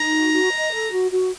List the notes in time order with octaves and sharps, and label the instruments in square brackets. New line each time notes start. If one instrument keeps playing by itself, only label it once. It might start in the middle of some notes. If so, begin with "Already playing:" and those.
Already playing: [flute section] D#4 [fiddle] A#5
[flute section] F#4
F#4
D#5
A4
F#4
F#4